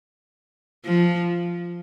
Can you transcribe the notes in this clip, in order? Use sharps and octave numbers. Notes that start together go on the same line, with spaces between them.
F3